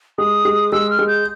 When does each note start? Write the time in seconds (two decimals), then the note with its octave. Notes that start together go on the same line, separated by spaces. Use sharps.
0.18 G#3 D#6
0.45 G#3
0.72 G#3 E6
0.90 F6
0.99 G#3
1.07 G6